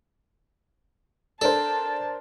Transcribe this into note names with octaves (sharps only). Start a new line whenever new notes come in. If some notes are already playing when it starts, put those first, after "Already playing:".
D4 A4 A#4 C5 A5